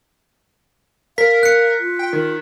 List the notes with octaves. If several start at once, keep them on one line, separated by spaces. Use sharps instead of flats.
A#4 F5 B6
F#6 C#7
F4
G5
D#3